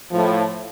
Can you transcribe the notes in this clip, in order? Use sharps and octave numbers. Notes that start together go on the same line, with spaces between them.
A2 F3